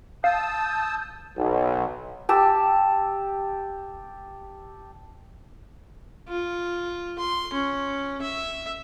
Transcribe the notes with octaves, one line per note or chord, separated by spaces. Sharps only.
F5 A5 D#6 E6 G6
B1
G4 A5 E6
F4
C6
C#4
E5